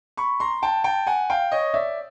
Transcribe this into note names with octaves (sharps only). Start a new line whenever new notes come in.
B5 C#6
A#5 C6
G5 A5
G5 A5
F#5 G#5
F5 G5
C#5 D#5
D5 E5